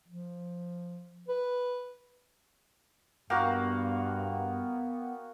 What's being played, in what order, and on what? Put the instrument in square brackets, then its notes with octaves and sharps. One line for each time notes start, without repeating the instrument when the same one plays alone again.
[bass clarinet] F3
B4
[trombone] G2 [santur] A#3 F#4 [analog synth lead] B3 [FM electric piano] G5 A#5